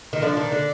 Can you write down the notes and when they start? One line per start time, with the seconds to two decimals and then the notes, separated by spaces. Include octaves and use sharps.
0.13 D#3 D#5
0.22 D3 F3 D5
0.37 D#3
0.52 D3